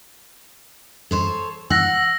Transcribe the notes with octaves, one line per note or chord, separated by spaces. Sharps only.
A4 C5 C#5
F#5 E6 A#6